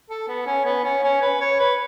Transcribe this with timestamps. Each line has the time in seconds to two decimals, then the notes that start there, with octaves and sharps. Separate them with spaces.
0.10 A4
0.28 B3
0.47 C#4
0.65 B3
0.84 C#4
1.04 C#4
1.22 B4
1.41 C#5
1.59 B4